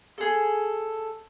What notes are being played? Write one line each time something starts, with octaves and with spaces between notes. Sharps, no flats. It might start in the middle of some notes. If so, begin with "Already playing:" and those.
G#4 A4